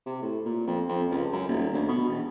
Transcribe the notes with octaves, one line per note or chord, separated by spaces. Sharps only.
C3
A2
A#2
F2
F2
C#2
F#2
D#1
D2
B2
E1